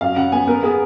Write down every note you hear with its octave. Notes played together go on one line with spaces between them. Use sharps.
F#2 F5
C#3 F#5
B3 G#5
B3 A#4
B3 G#4